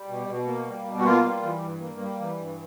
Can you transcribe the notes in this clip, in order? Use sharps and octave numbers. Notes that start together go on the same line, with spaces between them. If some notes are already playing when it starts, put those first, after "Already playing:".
Already playing: G3
B2
B2
A#3
G3
B2
F#4
A#3 F4
G3
E3
G2
A#3
G3
E3
G2